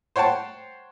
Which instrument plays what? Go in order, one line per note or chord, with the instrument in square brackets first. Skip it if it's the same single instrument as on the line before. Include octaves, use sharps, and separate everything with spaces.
[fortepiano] C5 C#5 F#5 G5 A5